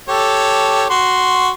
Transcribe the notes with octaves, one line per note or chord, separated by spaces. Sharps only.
G4 A4 C#5
F#4 C6